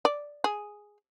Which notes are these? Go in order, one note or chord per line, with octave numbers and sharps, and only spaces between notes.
D5
G#4